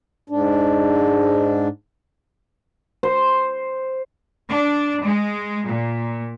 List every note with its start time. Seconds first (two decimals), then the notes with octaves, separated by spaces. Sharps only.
0.30 G#2 D4
3.03 C5
4.49 D4
5.04 G#3
5.67 A#2